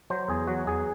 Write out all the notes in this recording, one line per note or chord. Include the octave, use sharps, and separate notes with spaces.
F#3 C5
E2 G#4
F#3 F#4
E2 G#4